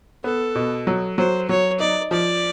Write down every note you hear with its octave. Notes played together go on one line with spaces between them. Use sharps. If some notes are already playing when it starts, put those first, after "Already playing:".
B3 A4
B2
F#3
F#3 C5
F#3 C#5
D#4 D5
F3 D5